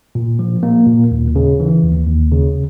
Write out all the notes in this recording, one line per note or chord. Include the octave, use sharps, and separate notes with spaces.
A#2
F3
A#3
A#2
D#2
C#3
E3
D#2
D#2
C#3